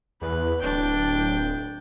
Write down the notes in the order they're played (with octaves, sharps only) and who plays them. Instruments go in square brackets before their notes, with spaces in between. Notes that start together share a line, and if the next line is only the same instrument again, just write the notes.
[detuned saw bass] E2 [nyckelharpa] B4
[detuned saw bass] D1 [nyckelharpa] D4 G5